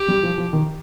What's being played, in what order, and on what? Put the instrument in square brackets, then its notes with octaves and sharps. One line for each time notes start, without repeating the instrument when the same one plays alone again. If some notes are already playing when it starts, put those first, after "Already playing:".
Already playing: [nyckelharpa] G4
[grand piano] G3
F3
F3
D#3